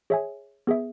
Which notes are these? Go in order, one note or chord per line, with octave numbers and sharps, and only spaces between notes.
G#4 C#5 E5 G#5
B3 G#4 E5